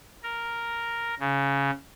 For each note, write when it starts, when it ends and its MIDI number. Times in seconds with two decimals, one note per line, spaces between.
0.23 1.15 70
1.20 1.71 49